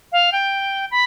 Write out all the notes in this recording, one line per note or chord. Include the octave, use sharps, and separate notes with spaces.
F5
G5
B5